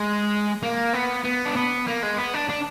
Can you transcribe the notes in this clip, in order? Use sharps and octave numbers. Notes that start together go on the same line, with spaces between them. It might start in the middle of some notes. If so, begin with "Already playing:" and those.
Already playing: G#3
A#3
B3
B3
D4
B3
A#3
G#3
B3
D4
D4